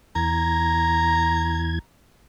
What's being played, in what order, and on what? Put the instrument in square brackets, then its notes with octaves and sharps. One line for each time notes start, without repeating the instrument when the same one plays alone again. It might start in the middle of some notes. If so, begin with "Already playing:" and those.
[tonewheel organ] E2 G#6 [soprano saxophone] A#5